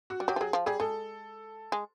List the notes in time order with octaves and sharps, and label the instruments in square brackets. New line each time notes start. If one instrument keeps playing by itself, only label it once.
[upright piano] F#4
[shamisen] G3
[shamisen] F#3 [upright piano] G4
[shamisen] F3
[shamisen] F#3 [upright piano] G#4
[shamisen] F3
[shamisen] G3 [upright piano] G#4
[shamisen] G#3 [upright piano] A4
[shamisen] G#3